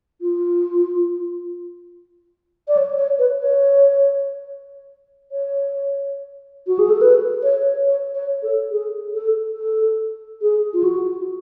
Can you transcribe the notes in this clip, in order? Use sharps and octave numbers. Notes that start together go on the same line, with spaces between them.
F4
D5
C#5
C#5
B4
C#5
C#5
F#4
G#4
A4
B4
C#5
C#5
C#5
A4
G#4
A4
A4
G#4
F4
F#4